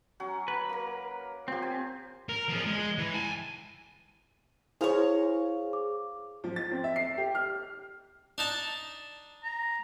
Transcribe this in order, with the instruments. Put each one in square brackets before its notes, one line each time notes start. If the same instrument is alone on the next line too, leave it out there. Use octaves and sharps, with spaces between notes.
[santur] F#3 C#4 F#5
[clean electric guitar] B4
[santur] A#3 A#4
[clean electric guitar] C4 [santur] F4 G4
[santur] G#5
[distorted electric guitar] A#4
F3 G#4
G#3
E3
G#5 A5
[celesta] E4 F7 [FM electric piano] G#4 C5 F5 [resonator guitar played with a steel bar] A#4 C#5
[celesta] D6
[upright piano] F3
A6
C4
E5
C7
G4
F6
[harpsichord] D4 D#4 A5
[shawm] A#5